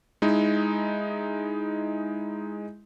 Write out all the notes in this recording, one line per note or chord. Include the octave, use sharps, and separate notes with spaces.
G#3 D#4 E4